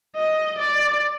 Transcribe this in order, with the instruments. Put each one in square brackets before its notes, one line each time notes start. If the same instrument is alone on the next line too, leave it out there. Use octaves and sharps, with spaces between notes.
[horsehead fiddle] D#5
D5